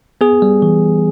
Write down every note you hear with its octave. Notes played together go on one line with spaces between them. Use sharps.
B3 G#4
G3
E3